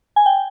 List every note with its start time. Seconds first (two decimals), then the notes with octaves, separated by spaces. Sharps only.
0.16 G#5
0.26 G5